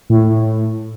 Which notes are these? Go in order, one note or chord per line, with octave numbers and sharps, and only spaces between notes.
A2